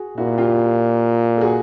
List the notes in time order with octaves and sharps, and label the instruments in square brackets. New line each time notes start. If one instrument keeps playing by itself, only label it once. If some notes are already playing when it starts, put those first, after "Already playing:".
Already playing: [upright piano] F#4 G#4
[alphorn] A#2 [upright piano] E4 F#4
[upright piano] F4 G4
A4
F#4 G#4